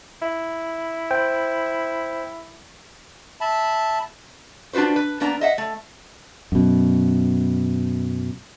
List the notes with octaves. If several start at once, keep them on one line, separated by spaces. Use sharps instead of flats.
E4
C5 G5
E5 A5 B5
D4 F4 F#4 B4 C5
B4
F3 A#3 B3 D4 A#5
D#5 E5 F#5
A3
F#2 B2